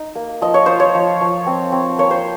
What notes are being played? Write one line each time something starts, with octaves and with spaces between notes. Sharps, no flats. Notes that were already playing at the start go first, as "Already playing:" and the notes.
Already playing: D#4
A#3
F3 D#5
C#5
F4 C5
C#5
F3
F3
C4
C4
A#3 C#5
C5